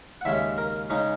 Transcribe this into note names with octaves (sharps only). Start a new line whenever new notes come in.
F#5
D#2 C#3 G#3 C#4 E5
A#4
C#3 G#3 C#4 D#4